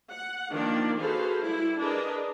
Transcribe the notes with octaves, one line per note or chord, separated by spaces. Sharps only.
F#5
D#3 F3 A#3 D4 D5
F#4 G#4 A4 B4 C5 F5
G3 E4
D4 G#4 A#4 B4 D5 D#5